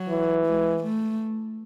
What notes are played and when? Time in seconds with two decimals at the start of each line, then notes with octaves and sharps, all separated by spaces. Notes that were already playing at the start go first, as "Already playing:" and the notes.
Already playing: F#3
0.09 E3
0.46 G#3
0.83 A3